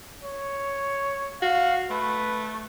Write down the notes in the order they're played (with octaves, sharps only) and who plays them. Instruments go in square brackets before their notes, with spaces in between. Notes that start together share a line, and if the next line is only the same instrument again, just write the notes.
[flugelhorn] C#5
[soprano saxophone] F#4 [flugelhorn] F5
[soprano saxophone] A3 [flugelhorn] B4